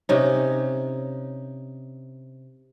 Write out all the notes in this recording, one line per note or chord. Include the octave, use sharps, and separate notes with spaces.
C3 C#4 D#4